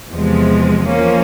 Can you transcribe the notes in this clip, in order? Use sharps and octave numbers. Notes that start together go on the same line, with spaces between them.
E2 C3 F3 G#3
F3 A#3 C#4